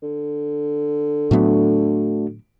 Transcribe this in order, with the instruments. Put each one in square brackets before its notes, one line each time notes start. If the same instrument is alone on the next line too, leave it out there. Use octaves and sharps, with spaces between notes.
[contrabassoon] D3
[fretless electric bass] A2 F#3 B3 [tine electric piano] A3 D4 F#4